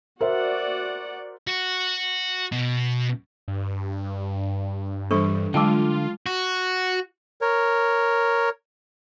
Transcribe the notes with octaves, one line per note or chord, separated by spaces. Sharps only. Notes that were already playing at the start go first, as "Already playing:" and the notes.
F#4 A#4 C5 D5 E5 F#5
F#4
B2
G2
E3 G3 D4 A4 C5 C#6
D3 F#3 G#3 F4 G5 A5 D6
F#4
A#4 C#5